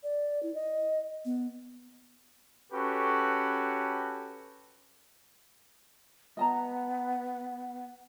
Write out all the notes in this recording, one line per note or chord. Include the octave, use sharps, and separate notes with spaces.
D5
E4
D#5
B3
C#4 F#4 G4 A4 B4
B3 D#5 A5 A#5